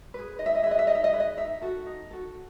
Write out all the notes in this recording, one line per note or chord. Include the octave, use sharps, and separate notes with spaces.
G#4 B4
D#4 D#5
E5
D#5
G#4 B4 D#5 E5
E5
D#4 D#5
E5
D#5
G#4 B4 E5
D#5
D#4 E5
F#4 A4
D#4
F#4 A4